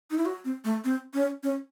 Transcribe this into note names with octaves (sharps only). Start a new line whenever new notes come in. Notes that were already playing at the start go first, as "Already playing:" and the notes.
D#4
E4
F#4
C4
A3
C4
C#4
C#4